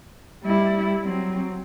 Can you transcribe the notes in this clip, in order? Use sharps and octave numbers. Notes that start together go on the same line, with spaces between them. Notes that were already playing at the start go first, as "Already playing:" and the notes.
G3 E4
F#3 C4